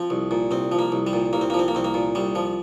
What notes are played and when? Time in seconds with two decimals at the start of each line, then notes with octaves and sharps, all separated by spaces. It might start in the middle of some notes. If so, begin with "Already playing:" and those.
Already playing: F3 C4
0.10 C2
0.31 A#2
0.51 C2 C4
0.72 F3
0.79 A#3
0.92 C2
1.07 G3
1.13 A#2
1.33 C2 A#3
1.41 C4
1.50 A#3
1.54 F3
1.59 C4
1.68 A#3
1.75 C2 C4
1.84 A#3
1.94 A#2
2.15 C2 G3
2.35 F3